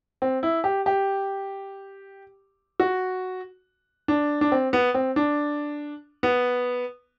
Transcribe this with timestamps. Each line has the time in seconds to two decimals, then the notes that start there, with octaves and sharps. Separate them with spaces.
0.22 C4
0.43 E4
0.64 G4
0.86 G4
2.80 F#4
4.08 D4
4.41 D4
4.52 C4
4.73 B3
4.94 C4
5.16 D4
6.23 B3